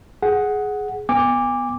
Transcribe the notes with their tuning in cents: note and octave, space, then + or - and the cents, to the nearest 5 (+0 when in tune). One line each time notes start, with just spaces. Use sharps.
G#4 +10 F#5 +0
B3 +0 G#5 -35 D6 +0